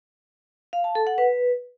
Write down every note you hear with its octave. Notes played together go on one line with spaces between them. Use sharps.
F5
A5
A4
F#5
B4